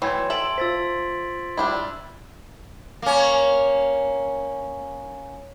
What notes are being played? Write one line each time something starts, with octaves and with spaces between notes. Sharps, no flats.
E3 F#3 A3 G5 C6 G#6
A4 E5 C6 D7 F#7
F4 C5 E6 A6 B6
G3 D4 E4
A#3 C#4